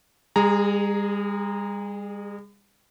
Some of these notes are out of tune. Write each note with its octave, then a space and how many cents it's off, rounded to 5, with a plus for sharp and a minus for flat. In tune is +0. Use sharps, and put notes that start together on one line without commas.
G3 +45 G#4 +0 A#5 +0